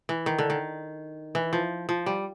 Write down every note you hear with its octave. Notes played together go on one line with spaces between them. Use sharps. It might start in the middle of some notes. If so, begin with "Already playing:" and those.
E3
D#3
D3
D#3
E3
F3
F3
G3